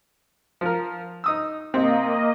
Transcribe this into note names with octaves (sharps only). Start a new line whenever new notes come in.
F3 A#4
D#4 D#6 E6
C3 A#3 C4 D#5